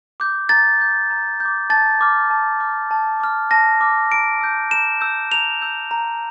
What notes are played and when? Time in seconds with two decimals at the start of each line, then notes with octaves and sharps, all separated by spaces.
0.20 D6 G6
0.49 A#5 A6
0.80 D6 G6
1.10 A#5
1.40 D6 G6
1.70 A5 A6
2.01 D6 F6
2.30 A5
2.60 D6 F6
2.91 A5
3.20 D6 F6
3.51 A5 A#6
3.81 D6 F6
4.12 A#5 D7
4.41 E6 G6
4.71 A#5 E7
5.01 E6 G6
5.32 A#5 F7
5.62 E6 G6
5.91 A#5